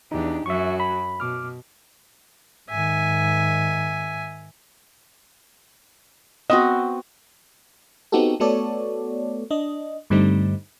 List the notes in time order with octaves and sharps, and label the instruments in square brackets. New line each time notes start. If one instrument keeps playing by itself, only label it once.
[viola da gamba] E2 D4 G4 [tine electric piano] D#4
[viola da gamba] F#2 F#3 F#4 [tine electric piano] E5 C#6
[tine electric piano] B5
[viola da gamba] B2 [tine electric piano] D6 F6
[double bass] G#2 D#3 [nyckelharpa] E5 G#5
[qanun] B3 C4 F#4 [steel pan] D#5
[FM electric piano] B3 C4 D#4 F#4 G4 A4
A3 B3 F#4 A4 C#5 D5
D4 D#5
G2 D3 G3 A3 C4 D#4